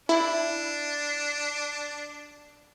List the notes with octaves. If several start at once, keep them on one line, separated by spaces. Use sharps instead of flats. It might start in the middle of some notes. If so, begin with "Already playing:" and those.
D4 E4